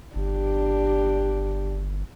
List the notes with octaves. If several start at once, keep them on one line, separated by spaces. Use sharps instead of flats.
G1 D4 G4